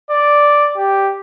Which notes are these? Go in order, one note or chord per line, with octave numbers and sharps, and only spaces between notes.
D5
G4